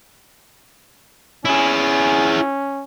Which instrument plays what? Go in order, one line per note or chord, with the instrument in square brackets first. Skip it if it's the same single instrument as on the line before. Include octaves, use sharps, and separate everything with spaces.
[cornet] C#4 [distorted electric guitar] E4 G#4